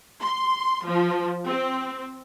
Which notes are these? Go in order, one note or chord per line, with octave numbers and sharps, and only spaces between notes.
C6
F3
C4